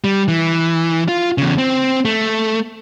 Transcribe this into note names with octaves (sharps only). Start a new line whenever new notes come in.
G3
E3
F4
E2 C#3
C4
A3